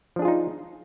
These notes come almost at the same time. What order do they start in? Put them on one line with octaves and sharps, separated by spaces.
F3 D4 G#4 F4 D#4